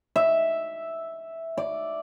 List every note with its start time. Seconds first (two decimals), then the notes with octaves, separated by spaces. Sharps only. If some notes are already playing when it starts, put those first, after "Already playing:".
0.16 E5
1.57 D5